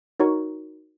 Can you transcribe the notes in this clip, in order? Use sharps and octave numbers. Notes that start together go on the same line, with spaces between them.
D#4 F#4 A#4 C#5 A#5 C#6